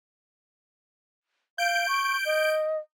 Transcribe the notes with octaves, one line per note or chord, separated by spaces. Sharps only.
F5 G6 D7
C#6
D#5